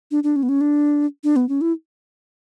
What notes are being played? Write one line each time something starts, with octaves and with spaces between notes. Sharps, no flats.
D4
D4
C#4
B3
C#4
D4
D4
B3
C#4
E4